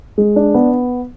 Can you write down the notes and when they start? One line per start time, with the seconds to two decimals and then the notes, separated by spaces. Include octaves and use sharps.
0.18 G#3
0.36 D4
0.54 B3